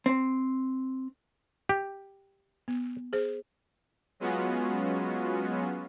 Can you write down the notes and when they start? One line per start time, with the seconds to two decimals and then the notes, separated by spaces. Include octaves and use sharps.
0.06 C4
1.69 G4
2.68 B3
3.13 G#4 C5
4.20 F#3 G#3 B3 C#4 F4 F#4